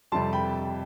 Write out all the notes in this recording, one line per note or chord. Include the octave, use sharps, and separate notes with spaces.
F2 C3 G3 A5 C6
G5 B5